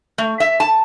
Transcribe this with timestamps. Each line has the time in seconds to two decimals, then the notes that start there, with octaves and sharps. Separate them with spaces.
0.18 A3
0.40 E5
0.60 A5